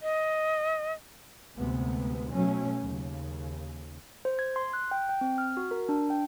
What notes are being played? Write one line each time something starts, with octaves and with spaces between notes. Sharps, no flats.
D#5
D2 C3 G#3 B3
B2 F#3 A3 C#4
D#2 C#3
C5
G#6
C6
F#6
G5
G5
C4
F6
F#4
A#4
D4
G5